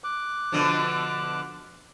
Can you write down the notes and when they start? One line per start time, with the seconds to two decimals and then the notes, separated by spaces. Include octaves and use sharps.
0.04 D6 F#6
0.52 B2 D3 F3